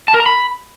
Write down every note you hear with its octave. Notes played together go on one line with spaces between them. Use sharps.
A5
A#4
A#5
B5